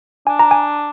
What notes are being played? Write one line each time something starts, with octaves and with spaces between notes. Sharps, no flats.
D4 G#5
A#5
G#5